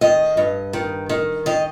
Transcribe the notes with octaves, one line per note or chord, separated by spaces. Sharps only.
D#3 D#5
G2
D#3
D#3
D#3 D#5